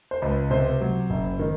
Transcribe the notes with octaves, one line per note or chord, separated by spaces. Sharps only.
C5
C#2
C3 C5
F#3
F#1
D#3